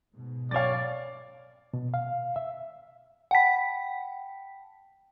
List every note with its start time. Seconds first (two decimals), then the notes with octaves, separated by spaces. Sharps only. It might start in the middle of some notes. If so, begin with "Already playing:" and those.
0.15 G#2 B2
0.51 F#2 C#5 D5 F5 A6
1.74 B2
1.94 F5
2.36 E5
3.31 F#5 G5 A5 B5 B6